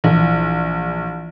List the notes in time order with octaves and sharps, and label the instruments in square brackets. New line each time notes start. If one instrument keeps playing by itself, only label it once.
[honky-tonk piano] A#1 [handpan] E3